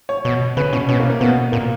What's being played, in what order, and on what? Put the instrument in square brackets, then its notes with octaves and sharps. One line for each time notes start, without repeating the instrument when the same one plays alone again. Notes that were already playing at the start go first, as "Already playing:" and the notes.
[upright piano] C#5
[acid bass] B2
[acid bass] C#3 [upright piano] B4
[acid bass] B2 [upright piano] C#4
[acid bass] B2 [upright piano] C#4
[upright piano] A#3
A#3
[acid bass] B2 [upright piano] B3
[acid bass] A#2 [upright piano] A#3